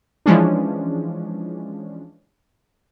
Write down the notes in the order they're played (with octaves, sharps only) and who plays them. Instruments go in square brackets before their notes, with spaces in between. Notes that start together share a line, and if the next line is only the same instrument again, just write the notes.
[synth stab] E3 F3 G#3 C#4 D4